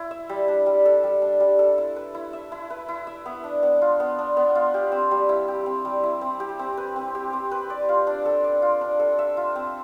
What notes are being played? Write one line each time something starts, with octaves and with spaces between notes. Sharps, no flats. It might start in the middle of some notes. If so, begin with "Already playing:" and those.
Already playing: E4
E5
G3
D4
G3
A4
G3
D4
G3
A4
E4
B4
E4
E5
E4
B4
E4
E5
B3
D4
B3
F4
B3
D4
B3
F4
G4
C4
G3
E4
G4
C4
G3
E4
C4
G4
C4
B4
C4
G4
C4
B4
D5
F4
D4
A4
D5
F4
D4
A4
E5
F4
C4